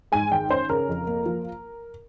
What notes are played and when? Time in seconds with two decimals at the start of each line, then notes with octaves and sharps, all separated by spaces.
0.12 G#2 G#5
0.31 G#1 G5
0.50 C#4 C5
0.69 C#3 A#4
0.89 F2
1.07 A#3
1.26 F3